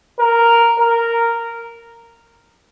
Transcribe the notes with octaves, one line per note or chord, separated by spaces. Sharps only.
A#4
A#4